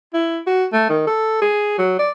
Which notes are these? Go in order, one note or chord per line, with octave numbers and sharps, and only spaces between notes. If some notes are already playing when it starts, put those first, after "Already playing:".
E4
F#4
A3
D#3
A4
G#4
F#3
D5